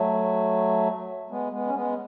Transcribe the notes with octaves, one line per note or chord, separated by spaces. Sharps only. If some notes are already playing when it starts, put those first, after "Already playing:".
Already playing: F#3 A3
G#3 B3
G#3 B3
C#4
G#3 B3